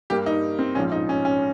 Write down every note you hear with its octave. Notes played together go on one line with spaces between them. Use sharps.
G2 G3 A#3 G4
D#4
C4
A#1 G#2 F3 C#4
D#4
C#4
C#4